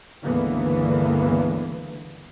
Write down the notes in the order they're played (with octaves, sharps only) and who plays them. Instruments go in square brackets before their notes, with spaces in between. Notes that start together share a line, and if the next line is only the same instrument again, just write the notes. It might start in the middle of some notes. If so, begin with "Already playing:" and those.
[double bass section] G1 C#2 D3 E3 A#3 B3